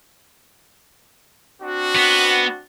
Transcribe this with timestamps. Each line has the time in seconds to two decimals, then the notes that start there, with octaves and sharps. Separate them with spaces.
1.61 C4 D4 F#4
1.95 B3